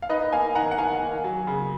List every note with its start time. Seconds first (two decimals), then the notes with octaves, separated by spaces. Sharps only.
0.02 F5
0.09 D#4 B4 D#5
0.32 A#3 F5 G#5
0.55 D#3 F#5 A#5
0.71 F#5
0.78 D#3 F5 G#5
1.01 A#3
1.24 F#3
1.47 C#3